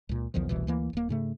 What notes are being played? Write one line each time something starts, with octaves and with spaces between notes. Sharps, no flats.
C#2 A#2
B1 E2 D#3 F3
F1 C2 B2 E3
D2 E3 A#3
D#1 A#3
G#2 C#3 A3